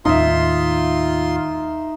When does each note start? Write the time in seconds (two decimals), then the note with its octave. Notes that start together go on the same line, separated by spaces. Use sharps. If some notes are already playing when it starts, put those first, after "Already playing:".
0.05 D#2 A2 D#4 F4 E5 C6